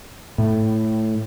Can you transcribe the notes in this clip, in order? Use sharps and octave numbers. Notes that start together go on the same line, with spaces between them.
A2